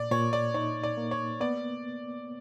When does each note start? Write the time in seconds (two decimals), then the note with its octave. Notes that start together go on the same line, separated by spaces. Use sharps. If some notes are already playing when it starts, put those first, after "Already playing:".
Already playing: A#2 D5
0.11 A#2 C#5
0.33 D5
0.54 D#4 C#5
0.83 D5
0.97 A#3
1.11 C#5
1.40 B3 D5